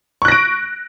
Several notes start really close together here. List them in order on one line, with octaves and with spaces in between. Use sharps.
C#6 F#6 A#6 D7